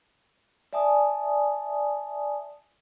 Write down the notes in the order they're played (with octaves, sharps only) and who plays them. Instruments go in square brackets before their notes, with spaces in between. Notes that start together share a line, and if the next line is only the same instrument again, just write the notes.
[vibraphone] D5 E5 G#5 A5 D#6